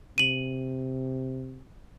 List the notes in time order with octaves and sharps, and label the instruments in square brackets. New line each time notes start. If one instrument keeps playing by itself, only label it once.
[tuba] C3 [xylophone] D#7 F#7